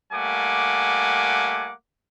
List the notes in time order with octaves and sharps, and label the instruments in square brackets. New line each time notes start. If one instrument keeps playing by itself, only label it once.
[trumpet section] G3 A3 A#3 F#5 G#5 D6